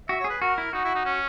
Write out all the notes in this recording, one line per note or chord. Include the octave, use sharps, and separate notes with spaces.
F#4 E5
G#4 C#5
B4
F#4 A#4
E4
D#4 F#4
E4
D#4
C#4